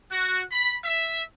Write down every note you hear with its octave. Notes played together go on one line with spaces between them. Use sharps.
F#4
B5
E5